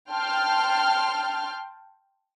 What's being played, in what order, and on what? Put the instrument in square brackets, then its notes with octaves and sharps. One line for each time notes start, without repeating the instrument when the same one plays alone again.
[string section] G5 A5 C6 F6